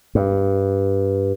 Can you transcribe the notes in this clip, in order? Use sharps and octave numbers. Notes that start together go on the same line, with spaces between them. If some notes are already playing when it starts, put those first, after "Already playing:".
G2